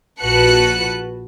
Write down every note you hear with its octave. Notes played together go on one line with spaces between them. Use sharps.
A#1 F#4 B4 A5 F#6 C#7